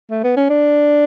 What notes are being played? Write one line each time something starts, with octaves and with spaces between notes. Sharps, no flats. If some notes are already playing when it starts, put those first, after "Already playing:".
A3
B3
C#4
D4